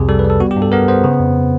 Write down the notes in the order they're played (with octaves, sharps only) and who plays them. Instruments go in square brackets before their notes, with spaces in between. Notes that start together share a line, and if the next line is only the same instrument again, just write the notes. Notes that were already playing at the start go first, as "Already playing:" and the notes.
Already playing: [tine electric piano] C2 F2 C3 G#4
G3 A4
B4
G3
A4
B3 F#4
G4
G2
A4
B3 A#4
B3 C5
C#3
F2